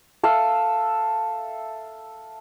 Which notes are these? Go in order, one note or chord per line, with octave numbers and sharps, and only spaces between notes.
A4 E5 F5